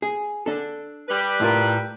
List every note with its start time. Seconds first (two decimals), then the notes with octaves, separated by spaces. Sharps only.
0.02 G#4
0.46 D4 A4
1.08 G3 B4
1.40 A2 F4 A#4